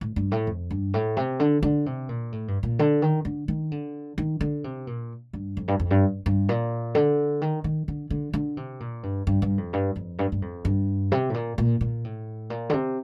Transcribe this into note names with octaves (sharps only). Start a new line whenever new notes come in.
A2
G2
A2
F2
G2
A2
C3
D3
D3
C3
A#2
A2
G2
A#2
D3
D#3
D3
D#3
D3
D#3
D3
C3
A#2
G2
F2
G2
F2
G2
G2
A#2
D3
D#3
D#3
D3
D3
D3
C3
A#2
G2
G2
G2
F2
G2
F2
G2
G2
F2
G2
C3
A2
A#2
A#2
A#2
A2
A#2
D3
C3